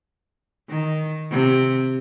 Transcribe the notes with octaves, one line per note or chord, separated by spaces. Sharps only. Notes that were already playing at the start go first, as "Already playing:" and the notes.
D#3
C3